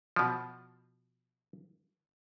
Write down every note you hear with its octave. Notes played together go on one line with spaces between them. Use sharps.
B2 F3